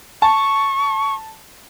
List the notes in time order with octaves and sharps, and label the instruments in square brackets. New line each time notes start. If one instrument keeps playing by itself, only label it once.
[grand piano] A5 [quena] C#6